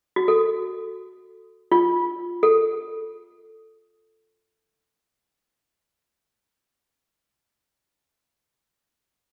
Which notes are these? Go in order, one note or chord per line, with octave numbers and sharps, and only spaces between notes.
F#4
A4
F4
A4